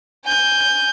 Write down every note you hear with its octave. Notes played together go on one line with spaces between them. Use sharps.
G#5 G6